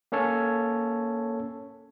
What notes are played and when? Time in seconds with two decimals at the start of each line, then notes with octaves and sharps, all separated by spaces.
0.12 A#3 C#4 A4 C#5 A5